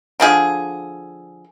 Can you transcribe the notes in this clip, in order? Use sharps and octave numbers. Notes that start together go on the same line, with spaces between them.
D3 F3 G#4